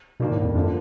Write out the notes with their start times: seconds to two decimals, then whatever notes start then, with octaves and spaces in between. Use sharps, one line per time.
0.20 B2 D#3 G3 A#3 D4
0.32 A2
0.44 F2
0.55 F#2 D3 F3 A#3